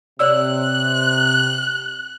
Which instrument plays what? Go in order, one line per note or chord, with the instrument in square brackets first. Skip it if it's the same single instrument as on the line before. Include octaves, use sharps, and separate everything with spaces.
[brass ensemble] C3 [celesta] C#5 D5 E6 [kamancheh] F#6